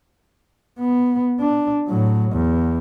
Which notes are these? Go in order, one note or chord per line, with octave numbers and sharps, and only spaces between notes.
B3
D4
A2 F#3
E2